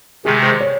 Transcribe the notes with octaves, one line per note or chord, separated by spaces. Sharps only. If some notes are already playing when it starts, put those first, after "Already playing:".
C3 D#3 G#3 G#4
C5
C#5